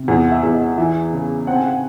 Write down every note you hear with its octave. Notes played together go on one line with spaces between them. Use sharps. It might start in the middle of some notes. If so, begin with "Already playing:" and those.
Already playing: C3
E2 F#5
F#5
E5
E2
D#5
E3 E5
C#3
C4 F#5
G#5
F#5